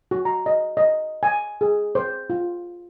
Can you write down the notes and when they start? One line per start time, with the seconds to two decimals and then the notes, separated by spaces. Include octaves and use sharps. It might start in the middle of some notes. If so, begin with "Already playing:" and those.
0.11 F#4
0.25 A#5
0.46 D#5
0.77 D#5
1.23 G#5
1.61 G#4
1.95 C5
2.30 F4